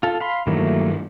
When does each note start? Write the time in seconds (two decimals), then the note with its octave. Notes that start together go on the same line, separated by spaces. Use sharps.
0.03 F4 A4
0.20 F5 B5 C6
0.47 G2 D#3 E3 F#3 A3 A#3